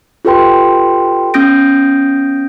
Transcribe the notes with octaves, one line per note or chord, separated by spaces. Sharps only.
F4 G4 A4 B4 G5 C6
B3 C#4 D#6 G6 A#6 D7